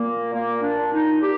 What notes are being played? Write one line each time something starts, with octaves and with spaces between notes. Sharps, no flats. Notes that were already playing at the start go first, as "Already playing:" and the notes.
Already playing: A#2 A#3
A#2 A#3
D4
A#2
D#4
A#2 G4